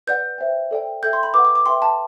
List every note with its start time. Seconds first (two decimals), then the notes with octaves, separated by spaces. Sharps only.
0.07 B4 D5 F#5 G6
0.38 C5 E5 G5
0.71 A4 D5 G5
1.03 A4 E5 G5 G6
1.13 C6
1.23 B5
1.34 B4 F#5 D6
1.45 D6
1.55 D6
1.66 B4 E5 G5 C6
1.82 A5